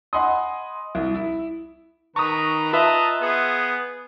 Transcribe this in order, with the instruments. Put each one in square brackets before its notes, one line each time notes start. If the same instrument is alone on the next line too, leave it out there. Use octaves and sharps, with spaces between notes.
[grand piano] D#5 F#5 G#5 B5 C6 D#6
C2
E4
[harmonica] D#3 B4 A#5 [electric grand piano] C#6 D#6
[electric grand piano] F4 B4 E5 [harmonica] D#5 A5 A#5
[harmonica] B3 G#4